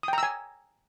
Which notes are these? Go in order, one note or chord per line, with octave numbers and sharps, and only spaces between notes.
G5 G#5 A#5 D#6 E6